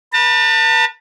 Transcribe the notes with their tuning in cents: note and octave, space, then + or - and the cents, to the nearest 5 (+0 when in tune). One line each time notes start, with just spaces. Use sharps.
B4 -30 A5 +35